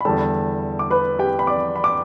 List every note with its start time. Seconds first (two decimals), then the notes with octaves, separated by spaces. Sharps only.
0.01 B5
0.05 E2 D3 G3 A4 A5
0.79 D6
0.90 B4 B5
1.19 G4 G5
1.39 B5
1.47 D5 D6
1.76 B5
1.84 D6